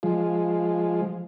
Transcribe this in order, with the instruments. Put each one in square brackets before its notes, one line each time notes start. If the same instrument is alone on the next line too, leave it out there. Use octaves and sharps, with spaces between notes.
[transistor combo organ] F3 G#3